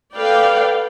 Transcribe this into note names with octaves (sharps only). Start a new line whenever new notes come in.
A4 B4 D5 F5 G5